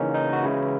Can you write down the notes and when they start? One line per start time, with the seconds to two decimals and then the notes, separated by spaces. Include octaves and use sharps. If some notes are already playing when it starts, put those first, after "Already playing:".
Already playing: C#3 E3 A#3 C#4 D#4
0.14 D#4
0.33 F#4
0.44 C#3 E3 G#3 E4